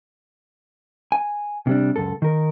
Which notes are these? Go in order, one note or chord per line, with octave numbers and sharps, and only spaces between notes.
G#5
C3 G3 D4
C#2 F#2 A4
D#3 A#4